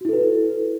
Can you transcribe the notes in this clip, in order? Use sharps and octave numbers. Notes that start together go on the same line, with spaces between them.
E4 F#4 A4 B4